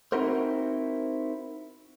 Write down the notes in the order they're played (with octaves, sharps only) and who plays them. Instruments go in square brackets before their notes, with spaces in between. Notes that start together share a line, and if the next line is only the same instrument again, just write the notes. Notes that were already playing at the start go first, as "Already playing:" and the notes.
[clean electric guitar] C4 D#4 E4 F#4 A#4 C5